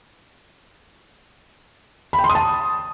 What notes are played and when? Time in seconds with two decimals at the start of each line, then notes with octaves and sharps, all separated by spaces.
2.13 B5
2.19 G5
2.24 C6
2.30 D#6
2.35 A5